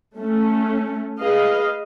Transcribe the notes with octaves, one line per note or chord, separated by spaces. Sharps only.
A3 C#4
G#4 B4 D#5 F5